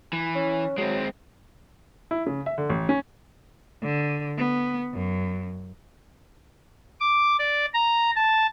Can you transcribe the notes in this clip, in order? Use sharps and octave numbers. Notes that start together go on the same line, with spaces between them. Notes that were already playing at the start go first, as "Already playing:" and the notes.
E3
C#4
F#3 G#3 C4
E4
C#3
E5
D3
A1
C#4
D3
B3
F#2
D6
D5
A#5
A5